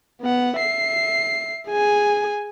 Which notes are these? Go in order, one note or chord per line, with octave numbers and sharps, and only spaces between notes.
B3 F#5
E5 C7
G#4 G#5